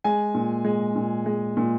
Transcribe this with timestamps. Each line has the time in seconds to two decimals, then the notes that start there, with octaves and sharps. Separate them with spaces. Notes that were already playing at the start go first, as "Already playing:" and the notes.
0.04 G#3 G#5
0.34 A#2
0.65 G#3
0.96 A#2
1.26 G#3
1.57 A#2